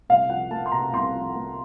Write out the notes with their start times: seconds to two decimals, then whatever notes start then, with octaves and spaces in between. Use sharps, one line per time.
0.09 C2 F5
0.30 F3 F#5
0.51 A#3 A5
0.66 C6
0.72 C3 A#5
0.93 C2 C6
1.15 F3
1.36 A#3